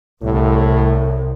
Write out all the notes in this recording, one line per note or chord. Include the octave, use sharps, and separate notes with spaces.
C2 A2